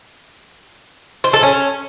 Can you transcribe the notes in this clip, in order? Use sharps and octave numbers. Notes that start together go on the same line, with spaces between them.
C5
A4
C#4